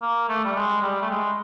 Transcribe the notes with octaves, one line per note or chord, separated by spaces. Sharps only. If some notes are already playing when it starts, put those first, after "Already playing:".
A#3
A3
G3
G#3
G3
A3
G#3